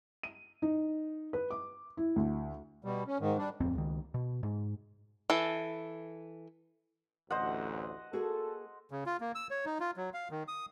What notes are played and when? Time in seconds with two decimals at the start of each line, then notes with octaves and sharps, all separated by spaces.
0.23 D#7
0.62 D#4
1.33 B4
1.50 D6
1.97 E4
2.16 D2
2.85 B2 G3
3.07 C#4
3.20 G#2 D#3
3.38 G3 D4
3.60 D1 F2 C4
3.75 C#2 D#3
4.14 B2
4.43 G#2
5.30 E3 A4
7.30 A1 D2 C5 D#5 F#5
8.13 A#3 F#4 G#4 A4
8.91 C#3
9.06 F4
9.20 A#3
9.35 E6
9.51 C#5
9.65 D#4
9.80 F4
9.97 F#3
10.14 F5
10.31 D#3
10.48 D#6